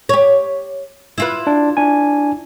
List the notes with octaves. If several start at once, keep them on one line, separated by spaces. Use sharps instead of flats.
G4 C#5
E4 F4 B4
D4
D4 G#5